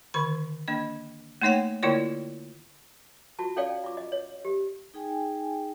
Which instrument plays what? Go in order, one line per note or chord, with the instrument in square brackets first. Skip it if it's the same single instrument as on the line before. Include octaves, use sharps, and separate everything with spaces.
[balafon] D3 D#3 B5
A#3 D4 D#5
A3 A#3 D#4 C#5 F#5 G5
D3 A#3 E4 F4 C#5 D5
[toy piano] F4 F#4 A5
C#4 A4 C#5 D5 F5 G5
F4 D6
D#5
C#5
G4
[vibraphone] D#4 G#4 G5 G#5